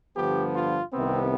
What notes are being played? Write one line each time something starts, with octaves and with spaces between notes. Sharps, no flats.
G2 D3 F3 B3 G4
F4
C2 C3 D#3 B3 C4